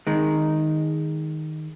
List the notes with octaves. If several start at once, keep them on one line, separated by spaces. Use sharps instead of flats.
D#3 G#3